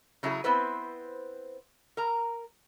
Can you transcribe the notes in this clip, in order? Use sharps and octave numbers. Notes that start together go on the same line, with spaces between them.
C#3 F#3 A3 E4 G#4
B3 C4 E4 B4 C5
A#4 A#5